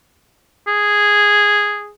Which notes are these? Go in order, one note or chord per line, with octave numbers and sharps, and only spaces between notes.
G#4